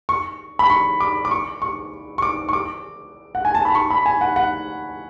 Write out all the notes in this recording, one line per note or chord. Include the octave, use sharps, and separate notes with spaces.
C#6
B5
C#6
D6
D6
C#6
C#6
C#6
D6
C#6
D6
F#5
G#5
A5
B5
C#6
B5
G#5
F#5
F#5